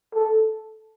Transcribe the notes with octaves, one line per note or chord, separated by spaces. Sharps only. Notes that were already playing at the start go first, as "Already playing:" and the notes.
A4